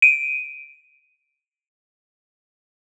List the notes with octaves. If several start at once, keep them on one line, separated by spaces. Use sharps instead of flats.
D7 D#7